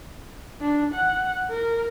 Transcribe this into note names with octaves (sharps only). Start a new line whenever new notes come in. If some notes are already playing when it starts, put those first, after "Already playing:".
D4
F#5
A#4